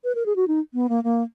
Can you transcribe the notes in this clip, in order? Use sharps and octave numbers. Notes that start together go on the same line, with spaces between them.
B4
A#4
G#4
F#4
D#4
B3
A#3
A#3